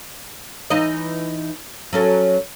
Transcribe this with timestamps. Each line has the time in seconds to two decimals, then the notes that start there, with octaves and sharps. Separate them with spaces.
0.70 E3 D#4 D#5
1.93 F#3 C#4 A4